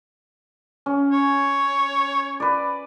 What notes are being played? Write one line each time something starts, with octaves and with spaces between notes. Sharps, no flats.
C#4
C#5
B4 D5